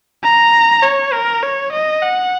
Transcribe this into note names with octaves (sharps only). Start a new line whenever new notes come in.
A#5
C#5
A#4
C#5
D#5
F#5